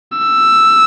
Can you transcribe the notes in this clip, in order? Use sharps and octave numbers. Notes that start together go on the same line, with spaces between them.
E6